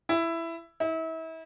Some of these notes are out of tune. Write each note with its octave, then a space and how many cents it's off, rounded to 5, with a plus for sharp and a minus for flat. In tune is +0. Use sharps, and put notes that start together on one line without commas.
E4 +10
E4 -35